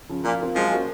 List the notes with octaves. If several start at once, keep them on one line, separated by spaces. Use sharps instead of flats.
C#3 F3
A#2 F3
C4 F4 A#4
F3 F#3 G#3
A#3 C#4 F#4